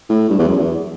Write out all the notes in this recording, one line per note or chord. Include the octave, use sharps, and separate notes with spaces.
A2
G2
E2
F#2
E2